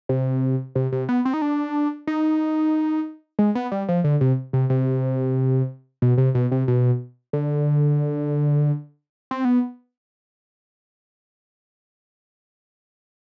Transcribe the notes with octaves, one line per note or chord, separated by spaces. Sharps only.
C3
C3
C3
B3
C4
D#4
D4
D#4
G#3
B3
G3
F3
D3
C3
C3
C3
B2
C3
B2
C3
B2
D3
C4
B3